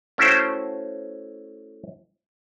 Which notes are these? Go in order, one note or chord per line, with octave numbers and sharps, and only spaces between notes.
A3 C#4 E4 F#4 C5 G5